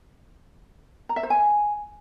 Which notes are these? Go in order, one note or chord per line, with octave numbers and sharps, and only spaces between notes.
A#5
E5
C5
G#5